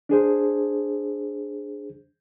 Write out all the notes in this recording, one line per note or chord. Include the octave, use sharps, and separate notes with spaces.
D4 G#4 C5